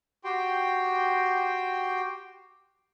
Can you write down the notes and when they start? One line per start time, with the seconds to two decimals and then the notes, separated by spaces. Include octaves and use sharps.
0.24 F#4 G4 G5 C6